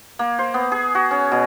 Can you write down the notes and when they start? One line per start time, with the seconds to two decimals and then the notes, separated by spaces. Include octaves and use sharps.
0.19 A#3
0.39 C5
0.54 B3
0.72 G#4
0.95 F#4
1.11 C#4
1.32 B2